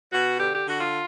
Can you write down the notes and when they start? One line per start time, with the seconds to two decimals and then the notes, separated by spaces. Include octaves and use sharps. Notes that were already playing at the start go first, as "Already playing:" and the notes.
0.13 B2 F#4
0.39 D3 G4
0.55 G4
0.67 D3 F#4
0.81 F4